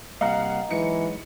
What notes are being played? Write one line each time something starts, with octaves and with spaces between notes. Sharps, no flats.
C3 G3 A#3 D#5 F5 F#5 A#5
E3 F#3 G#3 D#4 C#7